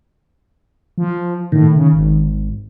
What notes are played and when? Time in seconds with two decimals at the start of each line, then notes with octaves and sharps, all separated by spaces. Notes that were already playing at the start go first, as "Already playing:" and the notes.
0.98 F3
1.52 A2 D#3
1.76 C#3
1.93 G#1